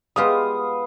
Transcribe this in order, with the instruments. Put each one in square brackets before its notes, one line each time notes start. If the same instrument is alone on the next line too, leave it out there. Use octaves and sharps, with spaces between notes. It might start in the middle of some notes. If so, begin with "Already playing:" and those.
[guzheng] G#3 F4 G4 [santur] B3 F5 D#6